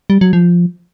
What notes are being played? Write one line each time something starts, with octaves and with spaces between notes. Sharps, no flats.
G3
F#3
F3